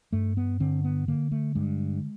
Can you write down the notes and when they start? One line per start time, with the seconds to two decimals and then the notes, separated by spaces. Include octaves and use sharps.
0.13 G2 A3
0.37 B3
0.60 D3 C4
0.84 B3
1.08 D3 A#3
1.32 A3
1.55 G2 G#3